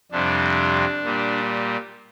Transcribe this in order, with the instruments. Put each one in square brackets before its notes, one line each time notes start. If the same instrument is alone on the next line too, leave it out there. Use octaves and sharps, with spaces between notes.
[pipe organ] F2 C3 G3 D4
A#2 G3